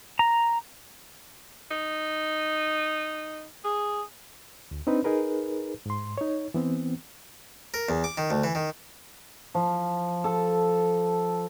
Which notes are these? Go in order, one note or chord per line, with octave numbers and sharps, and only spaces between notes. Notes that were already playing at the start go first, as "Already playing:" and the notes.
A#5
D#4
G#4
D2
C4 D4 D#4 B4
D#4 G#4 A#4 B4
G#2 C6
D#4 C#5
E3 B3 C4
A#4
E2
D6
D#3
D2
E3
D#3
F3
A4